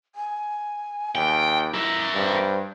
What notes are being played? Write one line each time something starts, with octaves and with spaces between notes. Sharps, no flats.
G#5
D#2 G5
E4 A#4 E5
G2 C5